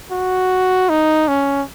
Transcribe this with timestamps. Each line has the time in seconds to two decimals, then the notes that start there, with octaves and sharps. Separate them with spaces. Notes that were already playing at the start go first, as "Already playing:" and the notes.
0.11 F#4
0.89 D#4
1.28 C#4